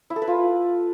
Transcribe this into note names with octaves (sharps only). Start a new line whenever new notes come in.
E4
A4
B4
F4